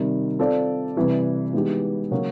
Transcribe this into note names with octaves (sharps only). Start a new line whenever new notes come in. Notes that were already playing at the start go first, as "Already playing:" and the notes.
Already playing: C3 D#3 G3
C4 F4 A4 D5
C3 E3 G3
E3 G#3 B3 D#4 G4
C#3 F#3 A#3 C#4